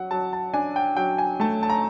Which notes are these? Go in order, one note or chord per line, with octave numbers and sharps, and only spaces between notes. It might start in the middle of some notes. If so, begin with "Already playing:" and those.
Already playing: F#3 F#5
F#3 A5
A5
D4 G#5
G5
F#3 G5
G#5
A3 A5
A5
A#5